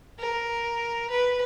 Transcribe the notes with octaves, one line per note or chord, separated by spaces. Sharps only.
A#4
B4